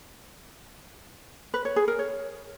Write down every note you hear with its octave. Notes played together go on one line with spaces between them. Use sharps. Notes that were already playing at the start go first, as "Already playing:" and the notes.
B4
C#5
G#4
A#4
C#5